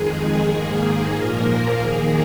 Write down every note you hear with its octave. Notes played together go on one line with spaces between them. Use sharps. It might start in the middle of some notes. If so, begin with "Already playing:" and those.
Already playing: F2 D#3 G#3 G#4
G#4
G#2 D#3 A#3
A#2 F3 A#3 A#4
D#2 D#3 A#3 G#4